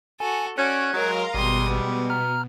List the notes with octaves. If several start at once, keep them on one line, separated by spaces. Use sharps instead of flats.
F#4 A4 G#5
C#4 F#4 D5 F#6 G#6
F#3 G#3 A#4 F5 A#5 C6
G#1 B2 G3 G#3 C6 D#6
B3
A#5 F6